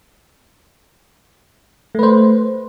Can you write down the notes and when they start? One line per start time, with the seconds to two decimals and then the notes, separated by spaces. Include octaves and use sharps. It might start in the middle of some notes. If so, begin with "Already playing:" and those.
1.95 A3
1.99 B4
2.03 C5